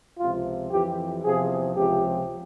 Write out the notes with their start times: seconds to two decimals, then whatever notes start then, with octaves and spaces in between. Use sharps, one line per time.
0.19 C#2 C3 F3 F4
0.71 F2 E3 G4
1.24 E2 C3 F3 G#4
1.76 C#2 C3 F3 G4